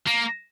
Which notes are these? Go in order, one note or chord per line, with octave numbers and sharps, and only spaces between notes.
A#3